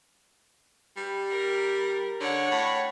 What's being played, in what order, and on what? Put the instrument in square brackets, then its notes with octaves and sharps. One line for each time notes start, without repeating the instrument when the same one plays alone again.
[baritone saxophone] G3
[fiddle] A#4
[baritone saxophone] D3 [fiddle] C#5 F#5
[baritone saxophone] A2